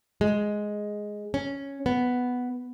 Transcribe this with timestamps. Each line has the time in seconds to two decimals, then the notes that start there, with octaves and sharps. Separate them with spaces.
0.21 G#3
1.34 C#4
1.86 B3